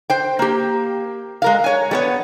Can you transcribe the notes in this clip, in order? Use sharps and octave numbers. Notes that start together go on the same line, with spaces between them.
C5 G5
A#3 G4
G#3 A#4 F5
C#5 G#5
G3 B3 C#5